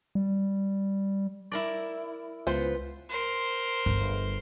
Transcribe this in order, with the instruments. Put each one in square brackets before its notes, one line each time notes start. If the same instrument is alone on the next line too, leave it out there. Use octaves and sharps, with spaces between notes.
[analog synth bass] G3
[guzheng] E4 A#4 D5
[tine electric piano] C#2 [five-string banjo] B3 F4 C5
[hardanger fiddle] A#4 C5
[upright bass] G1